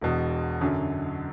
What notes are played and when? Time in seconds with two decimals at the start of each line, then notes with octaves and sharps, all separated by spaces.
0.01 E1 E2 B2
0.61 F#2 D3 F#3